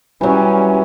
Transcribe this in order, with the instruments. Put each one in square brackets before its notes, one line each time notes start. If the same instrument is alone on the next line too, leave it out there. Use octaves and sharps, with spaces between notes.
[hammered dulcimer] E3 F#3 [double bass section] G3 C#4